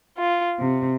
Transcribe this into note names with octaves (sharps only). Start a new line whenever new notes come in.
F4
C3